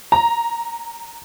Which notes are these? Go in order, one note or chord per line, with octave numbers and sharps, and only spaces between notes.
A#5